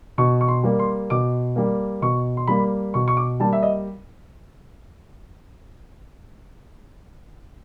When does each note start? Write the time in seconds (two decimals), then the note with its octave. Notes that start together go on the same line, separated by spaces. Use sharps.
0.18 B2 C#6
0.41 C#6
0.48 C6
0.64 G3 A#3
0.79 C6
1.10 B2 D6
1.56 G3 A#3
2.02 B2 C#6
2.37 C6
2.47 G3 A#3 B5
2.94 B2 C#6
3.08 C#6
3.17 D6
3.40 G3 A#3 A5
3.53 E5
3.63 D#5